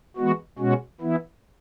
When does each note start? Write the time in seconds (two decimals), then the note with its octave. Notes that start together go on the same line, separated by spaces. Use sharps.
0.17 E3 G#3 B3 F#4
0.59 B2 G#3 C#4 F#4
1.01 E3 B3 E4